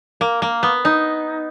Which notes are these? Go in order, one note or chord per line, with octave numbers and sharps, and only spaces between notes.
A#3
A#3
B3
D#4